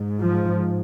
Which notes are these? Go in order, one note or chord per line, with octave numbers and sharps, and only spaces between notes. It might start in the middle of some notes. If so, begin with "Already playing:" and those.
Already playing: G#2
F3